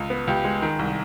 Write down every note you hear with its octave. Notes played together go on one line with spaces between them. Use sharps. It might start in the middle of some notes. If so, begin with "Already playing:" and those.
Already playing: C#2
B3
C#2 G4
G#3
D#3
C2